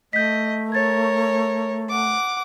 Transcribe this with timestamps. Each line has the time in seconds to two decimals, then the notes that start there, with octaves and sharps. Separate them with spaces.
0.13 A3 D#5 G6 B6
0.72 A#4 C#5 G#6 A6
1.88 F#5 D6